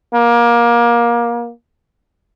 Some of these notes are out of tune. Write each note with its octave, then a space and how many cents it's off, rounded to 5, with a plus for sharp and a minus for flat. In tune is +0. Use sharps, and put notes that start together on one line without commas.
A#3 +25